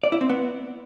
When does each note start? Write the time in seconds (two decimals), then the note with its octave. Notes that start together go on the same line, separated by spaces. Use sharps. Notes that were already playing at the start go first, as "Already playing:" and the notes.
0.03 D5
0.12 E4
0.21 C4
0.29 B3